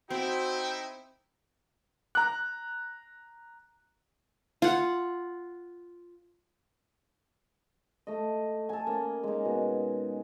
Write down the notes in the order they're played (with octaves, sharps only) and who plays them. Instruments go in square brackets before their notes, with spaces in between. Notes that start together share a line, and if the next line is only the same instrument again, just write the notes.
[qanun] C4 [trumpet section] D#4 E4 [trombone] F#4 [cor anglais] G5
[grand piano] A#5 F#6
[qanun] F4 F#5
[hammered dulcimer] A3 D#5
A4 G#5
A#3 C#4
G#3 D#4
B2